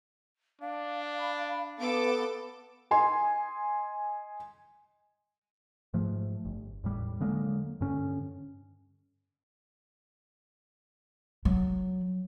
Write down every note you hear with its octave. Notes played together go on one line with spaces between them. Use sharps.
D4 F5
B5
B3 A4 D6
D#5 G#5 C6
G#2 F3 A3
G1
E2 A2 G3
D3 F#3 G#3 A#3
G2 D3 C#4
F#3